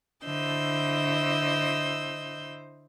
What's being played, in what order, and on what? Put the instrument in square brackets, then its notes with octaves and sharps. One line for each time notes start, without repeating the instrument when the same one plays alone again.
[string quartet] D3 E4 C5 D#5 E6 G6